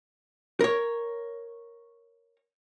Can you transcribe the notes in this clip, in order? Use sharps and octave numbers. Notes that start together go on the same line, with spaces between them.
A#4 C#5